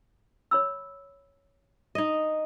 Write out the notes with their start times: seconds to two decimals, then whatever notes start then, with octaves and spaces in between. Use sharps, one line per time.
0.51 C#5 B5 E6
1.95 D#4 D#5